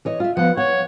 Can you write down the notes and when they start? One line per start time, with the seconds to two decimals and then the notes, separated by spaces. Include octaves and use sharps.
0.05 E3 C#5 D#5
0.20 F4 E5
0.37 F3 B3 F#5
0.57 C#5 F#5